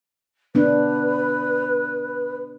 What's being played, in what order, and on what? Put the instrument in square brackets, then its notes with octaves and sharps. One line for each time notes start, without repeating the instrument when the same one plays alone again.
[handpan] B3 D4 [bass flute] B4